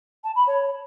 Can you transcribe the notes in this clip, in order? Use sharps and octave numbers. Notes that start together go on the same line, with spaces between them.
A5
B5
C#5